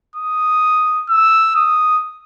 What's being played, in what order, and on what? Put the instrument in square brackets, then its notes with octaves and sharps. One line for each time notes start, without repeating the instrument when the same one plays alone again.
[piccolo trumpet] D#6
E6
D#6